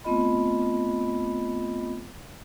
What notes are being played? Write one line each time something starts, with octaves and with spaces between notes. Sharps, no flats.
A3 B3 C4 F4 D#5 B5